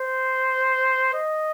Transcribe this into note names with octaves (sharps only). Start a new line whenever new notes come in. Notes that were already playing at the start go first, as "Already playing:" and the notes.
Already playing: C5
D#5